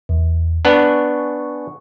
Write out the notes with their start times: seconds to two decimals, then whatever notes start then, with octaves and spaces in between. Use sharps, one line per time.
0.09 E2
0.65 B3 D4 G#5 C#6